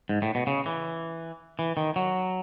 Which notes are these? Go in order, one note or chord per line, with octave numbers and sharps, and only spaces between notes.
G#2
A2
B2
C#3
E3
E3
D#3
F#3